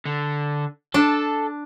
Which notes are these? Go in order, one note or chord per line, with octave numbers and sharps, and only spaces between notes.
D3
D4 A4